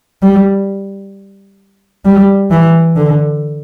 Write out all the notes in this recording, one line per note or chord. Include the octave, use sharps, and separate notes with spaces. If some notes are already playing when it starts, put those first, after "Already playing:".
G3
G3
E3
D3